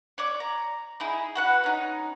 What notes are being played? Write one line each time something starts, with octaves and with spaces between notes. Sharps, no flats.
C#5 D5 D6
A#5
D#4 E4 G#4
F#4 B4 F#5
C#4 D#4